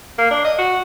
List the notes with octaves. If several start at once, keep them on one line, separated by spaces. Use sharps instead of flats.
A#3
D4
D#5
F#4